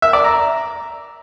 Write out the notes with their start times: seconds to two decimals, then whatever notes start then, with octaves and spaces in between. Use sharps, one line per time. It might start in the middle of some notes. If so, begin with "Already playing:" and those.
0.02 E5
0.13 D5
0.24 A#5